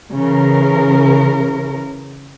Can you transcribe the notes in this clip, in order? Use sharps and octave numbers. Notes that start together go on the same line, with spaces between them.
C#3 E3 A#4